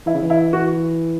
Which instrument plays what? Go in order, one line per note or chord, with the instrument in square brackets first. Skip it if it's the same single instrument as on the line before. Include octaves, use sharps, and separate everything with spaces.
[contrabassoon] E3 [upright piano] E4
[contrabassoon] C#3
E3
[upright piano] E4
F#4